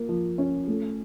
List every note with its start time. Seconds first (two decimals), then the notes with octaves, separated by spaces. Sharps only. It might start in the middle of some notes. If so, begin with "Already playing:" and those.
Already playing: A#3 F4
0.09 F3
0.38 C#4
0.68 A3